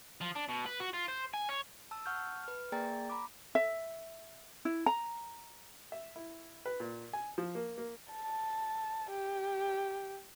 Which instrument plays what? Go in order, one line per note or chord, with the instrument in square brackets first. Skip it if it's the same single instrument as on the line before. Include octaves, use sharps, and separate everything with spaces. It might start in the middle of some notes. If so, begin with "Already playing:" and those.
[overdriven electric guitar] F3
D4
B2
B4
F#4
F4
C5
G#5
C#5
[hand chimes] A5 E6
F#5 C#6 F6 G6
A5
B4 F6
A#3 G#4 D5 G5 A#5 A6
A#5 B5 D6
[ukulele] E5
E4
A#5
[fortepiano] E5
E4
B4
A#2
G#5
F3
A#3
A#3
[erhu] A5
G4